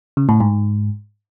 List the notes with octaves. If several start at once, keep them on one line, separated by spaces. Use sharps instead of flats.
C#3
A2
G#2